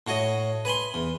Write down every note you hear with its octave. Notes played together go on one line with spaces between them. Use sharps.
A2 F#4 C#5 D#5
B4 G#5 B5 C6
E2